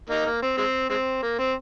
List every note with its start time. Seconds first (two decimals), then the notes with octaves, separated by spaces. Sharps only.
0.10 A#3 D#4
0.26 A#3
0.43 C4
0.57 G#3 C4
0.90 G#3 C4
1.23 A#3
1.39 C4